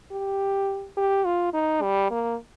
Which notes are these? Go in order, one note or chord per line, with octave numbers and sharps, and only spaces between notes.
G4
G4
F4
D#4
G3
A#3